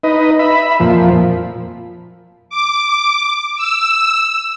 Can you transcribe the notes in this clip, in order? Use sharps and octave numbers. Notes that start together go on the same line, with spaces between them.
D#4 B4 D#5
E5 B5
F2 A#2 F3
D6
E6